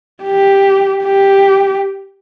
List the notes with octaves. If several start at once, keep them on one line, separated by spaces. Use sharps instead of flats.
G4
G4